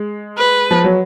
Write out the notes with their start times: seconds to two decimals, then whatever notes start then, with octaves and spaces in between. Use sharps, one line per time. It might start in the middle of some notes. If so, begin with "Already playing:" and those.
Already playing: G#3
0.37 B4
0.71 F3
0.84 F#3